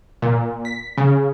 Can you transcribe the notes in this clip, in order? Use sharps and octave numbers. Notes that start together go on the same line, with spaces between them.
A#2
B6
C#3